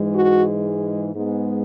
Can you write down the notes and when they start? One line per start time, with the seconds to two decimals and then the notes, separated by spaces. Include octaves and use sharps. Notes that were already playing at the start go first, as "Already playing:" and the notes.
Already playing: G#2 E3 G#3
0.15 F#4
1.13 G#2 G#3 B3